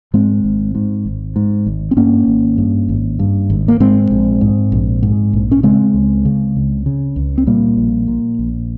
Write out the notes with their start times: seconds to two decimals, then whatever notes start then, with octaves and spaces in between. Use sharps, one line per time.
0.14 G#2 G#3 C4
0.44 G#1
0.75 G#2
1.05 G#1
1.36 G#2
1.66 G#1
1.91 C4
1.97 G2 A#3 C#4
2.28 G#1
2.58 G2
2.89 G#1
3.19 G2
3.50 G#1
3.68 A#3
3.80 G#2 G#3 C4
4.11 A#1
4.41 G#2
4.72 A#1
5.03 G#2
5.33 A#1
5.51 C#4
5.63 C#3 G#3 C4
5.94 C#2
6.25 C#3
6.56 C#2
6.86 C#3
7.16 C#2
7.38 C4
7.47 A#2 G3 A#3
7.77 A#1
8.08 A#2
8.39 A#1